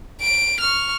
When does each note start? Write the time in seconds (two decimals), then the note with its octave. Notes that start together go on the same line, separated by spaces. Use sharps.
0.21 D7
0.61 C#6 F6